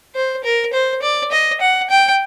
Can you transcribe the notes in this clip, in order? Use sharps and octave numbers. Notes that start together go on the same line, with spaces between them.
C5
A#4
C5
D5
D#5
F#5
G5